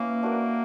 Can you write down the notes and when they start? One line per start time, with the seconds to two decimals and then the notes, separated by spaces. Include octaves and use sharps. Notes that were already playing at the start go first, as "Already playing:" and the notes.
Already playing: A#3 C#4 E4 B4
0.23 D4 F#4 A#4 D5